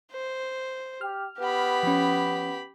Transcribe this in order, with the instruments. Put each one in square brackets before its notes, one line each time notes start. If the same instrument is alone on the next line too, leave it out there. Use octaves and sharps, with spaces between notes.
[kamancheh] C5
[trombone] G4 [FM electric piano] F6
[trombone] B3 [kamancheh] G4 B5
[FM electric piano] F3 C#4